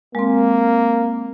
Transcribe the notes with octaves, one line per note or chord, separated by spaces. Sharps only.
G#3 A#3 C4